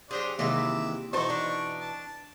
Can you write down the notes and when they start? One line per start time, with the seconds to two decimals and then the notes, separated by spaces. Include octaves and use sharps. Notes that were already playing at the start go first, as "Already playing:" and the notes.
0.11 F#3 D4 G4 G#4 C5
0.39 D#2 C3 E3 G#3 E5 D6
1.13 B2 E3 D#4 A4 C5 C#6
1.30 D4
1.81 A5